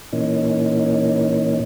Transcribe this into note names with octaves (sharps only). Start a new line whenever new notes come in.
A#2 E3 A#3 C#4 D#4